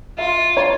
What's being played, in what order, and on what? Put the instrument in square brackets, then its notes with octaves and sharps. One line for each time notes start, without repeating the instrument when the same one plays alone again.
[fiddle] F4 [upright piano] E5
[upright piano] C#5